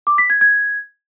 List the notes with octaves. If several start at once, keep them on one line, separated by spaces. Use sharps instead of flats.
D6
B6
G#6
G#6